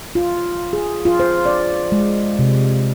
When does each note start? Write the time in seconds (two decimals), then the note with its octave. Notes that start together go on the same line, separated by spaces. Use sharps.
0.15 F4
0.73 G#4
1.05 F4
1.20 C5
1.46 D5
1.92 G#3
2.39 C3